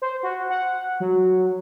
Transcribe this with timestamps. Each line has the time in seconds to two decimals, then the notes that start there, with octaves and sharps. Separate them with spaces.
0.02 C5
0.23 F#4
0.50 F#5
1.00 F#3